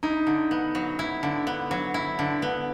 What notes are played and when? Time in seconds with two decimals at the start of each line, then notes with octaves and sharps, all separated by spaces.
0.03 D#4 E4
0.27 D3
0.51 B3
0.75 F#3
0.99 E4
1.23 D3
1.47 B3
1.71 F#3
1.94 E4
2.19 D3
2.42 B3